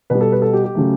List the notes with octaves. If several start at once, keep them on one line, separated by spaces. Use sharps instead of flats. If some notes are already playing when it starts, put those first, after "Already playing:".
B2 G3 B4
A4
B4
A4
G4
G4
C#3 F#3 A3